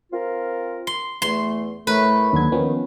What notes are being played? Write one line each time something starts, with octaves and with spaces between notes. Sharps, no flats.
C4 F4 A#4
C6
E2 A3 C6
A2 A3 A#4 B4
D#2 D3 F#3 G#6
D#3 F3 B3 C#4